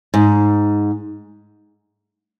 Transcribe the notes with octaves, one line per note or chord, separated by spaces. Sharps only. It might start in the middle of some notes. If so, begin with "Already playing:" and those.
G#2